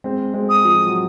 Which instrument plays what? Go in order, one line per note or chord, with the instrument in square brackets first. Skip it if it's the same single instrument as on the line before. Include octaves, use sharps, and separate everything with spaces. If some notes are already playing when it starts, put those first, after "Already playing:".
[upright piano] G#3 C4
G#3 C4
[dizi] D#6
[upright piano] F3
F#3